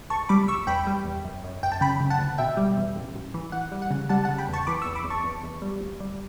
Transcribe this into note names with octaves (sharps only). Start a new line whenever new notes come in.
C#2 A5 C#6
G3 B5 D6
C#2 C#6 E6
E2 G5 B5
G3
E2
F#2
F#2
F#2 G5
A5
C#3 G5 B5
C#3
F#5 A5
D2
B2 E5 G5
G3
E2
A1
A1
E3
E3 F#5
G3
F#5
C#3
G3 F#5 A5
F#5 A5
C#3
G5 B5
E2 A5 C#6
E3 B5 D6
C#6 E6
E2
B5 D6
E2
A5 C#6
E2
E2
G3
D2
G3